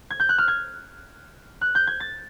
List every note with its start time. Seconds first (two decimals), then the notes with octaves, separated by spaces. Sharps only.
0.10 G#6
0.20 G6
0.29 F#6
0.38 F6
0.48 G#6
1.61 F#6
1.75 G6
1.87 G#6
2.00 A6